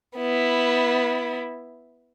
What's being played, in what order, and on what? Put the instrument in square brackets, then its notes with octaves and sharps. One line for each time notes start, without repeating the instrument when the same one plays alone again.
[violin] B3 E4